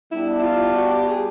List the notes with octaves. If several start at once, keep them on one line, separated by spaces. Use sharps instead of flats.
G3 B3 D4 E4
E4
F4
F#4
G4
G#4